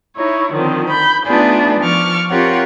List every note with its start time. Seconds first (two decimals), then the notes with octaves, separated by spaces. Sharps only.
0.15 D#4 E4 C#5
0.52 D3 D#3 F3 C4
0.89 B5 G6
1.25 A3 B3 D4 D#4 F4 G#4
1.80 F3 C#6 D6 F6
2.30 C4 F4 G4 A#4 C#5 F#5